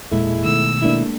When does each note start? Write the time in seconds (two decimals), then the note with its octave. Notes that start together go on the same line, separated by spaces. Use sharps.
0.12 E1 A#2 G#3 E4 G#4 A4
0.45 B2 D#3 A3 E6
0.82 G#3 A#3 D4 E4